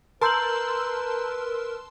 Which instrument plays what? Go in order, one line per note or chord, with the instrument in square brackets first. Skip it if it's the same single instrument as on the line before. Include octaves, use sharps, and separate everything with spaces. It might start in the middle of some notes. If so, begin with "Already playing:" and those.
[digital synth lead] A#4 [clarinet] B4 [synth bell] A5 C6 E6 [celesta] A#5 G6 F#7